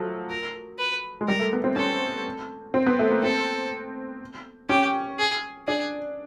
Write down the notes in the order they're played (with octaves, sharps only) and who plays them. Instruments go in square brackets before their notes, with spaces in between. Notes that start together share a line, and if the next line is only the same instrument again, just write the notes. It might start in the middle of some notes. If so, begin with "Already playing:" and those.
Already playing: [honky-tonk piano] F3 F#3 A3
[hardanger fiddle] A#4
B4
[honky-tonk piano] G#3
[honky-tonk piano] G3 [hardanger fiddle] A#4
[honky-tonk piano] A3
B3
C4
[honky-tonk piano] C#4 [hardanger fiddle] A4
[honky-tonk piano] C4
B3
A3
A#3
[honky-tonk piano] C4 [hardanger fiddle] A4
[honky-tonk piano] C#4 [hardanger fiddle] G4
[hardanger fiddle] G#4
[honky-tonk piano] D4 [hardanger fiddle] G#4